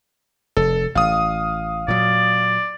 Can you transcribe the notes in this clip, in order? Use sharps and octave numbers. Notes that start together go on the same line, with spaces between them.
F1 A4
A1 F5 D#6
A#2 F#3 D5